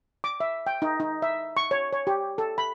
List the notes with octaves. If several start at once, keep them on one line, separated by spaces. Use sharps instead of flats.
D6
E5
G5
D#4
D#4
E5
C#6
C#5
C#5
G4
A4
B5